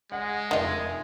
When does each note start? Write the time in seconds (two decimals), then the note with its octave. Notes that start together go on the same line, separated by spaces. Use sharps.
0.12 G#3 F#5
0.51 F1 D#3 F4 D#5 E5